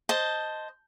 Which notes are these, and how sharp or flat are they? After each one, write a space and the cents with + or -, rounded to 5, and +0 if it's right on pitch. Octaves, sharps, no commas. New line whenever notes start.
C5 +0 D#5 +0 A5 +0